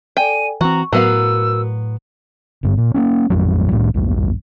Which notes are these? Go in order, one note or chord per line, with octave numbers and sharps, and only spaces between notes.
A4 D5 G5 G#5 D#7
E3 C4 F#4 A#5 C#6
A2 F#3 B3 F#4 A#4 F5 E6
G#1 G2
A#2
A#3 B3 C#4
A1 F2 F#3
C2 A2 G3
A#1 E2 G2